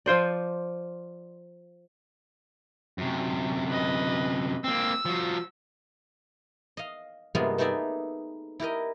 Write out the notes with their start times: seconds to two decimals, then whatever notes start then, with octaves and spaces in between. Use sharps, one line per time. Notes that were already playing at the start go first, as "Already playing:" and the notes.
0.06 F3 F4 C5 D5
2.98 F#2 C3
3.68 B4 D#5
4.64 A#3 C4 E6
5.05 F3 F#4
6.77 D#5 F5
7.35 G2 C3 G#3 A#3 B3 F4
7.58 A3 B3 D#4 G#4 D5 E5
8.60 E4 G4 A#4 D#5